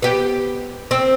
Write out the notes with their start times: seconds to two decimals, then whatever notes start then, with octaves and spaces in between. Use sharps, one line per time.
0.02 B3 G4
0.91 C4